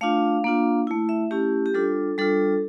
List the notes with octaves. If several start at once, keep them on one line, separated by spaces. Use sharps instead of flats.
A3 D4 F4 F5
A#3 D4 F4
A3 E4
E5
A3 C#4 E4 G4
G4
G3 D4 F4 A4
G3 D4 F4 A4